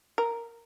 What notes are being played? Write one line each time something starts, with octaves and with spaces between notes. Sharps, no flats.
A#4